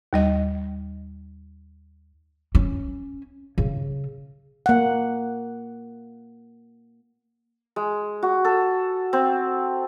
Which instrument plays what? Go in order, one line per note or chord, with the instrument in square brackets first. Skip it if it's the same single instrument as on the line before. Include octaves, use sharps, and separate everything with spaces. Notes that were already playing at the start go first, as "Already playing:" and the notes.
[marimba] D#2 G3 D#5
[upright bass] C#4
C#3
[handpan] A#3 F#5
[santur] G#3
F#4
A4
C4